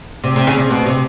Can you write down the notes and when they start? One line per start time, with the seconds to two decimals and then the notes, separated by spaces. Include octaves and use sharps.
0.24 C3
0.36 C3
0.47 C#3
0.58 C3
0.71 B2
0.86 C3